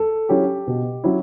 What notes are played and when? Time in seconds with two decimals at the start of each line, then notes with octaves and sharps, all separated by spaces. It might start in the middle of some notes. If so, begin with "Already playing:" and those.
Already playing: A4
0.29 F#3 C#4 E4 G4
0.67 B2
1.04 F#3 C#4 E4